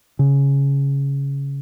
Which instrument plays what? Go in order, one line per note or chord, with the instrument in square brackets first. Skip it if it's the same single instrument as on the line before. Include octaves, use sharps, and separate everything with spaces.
[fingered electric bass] C#3